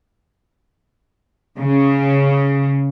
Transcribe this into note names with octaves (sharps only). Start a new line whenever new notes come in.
C#3